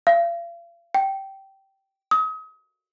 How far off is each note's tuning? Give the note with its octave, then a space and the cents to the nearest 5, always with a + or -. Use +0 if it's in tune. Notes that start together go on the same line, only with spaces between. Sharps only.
F5 -40
G5 -15
D#6 +35